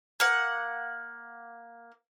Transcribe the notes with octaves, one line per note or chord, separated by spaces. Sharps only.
A#3 F#5